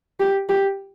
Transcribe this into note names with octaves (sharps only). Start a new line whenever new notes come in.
G4
G4